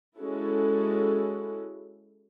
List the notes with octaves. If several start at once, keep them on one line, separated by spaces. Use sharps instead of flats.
G#3 C#4 E4 F#4 A4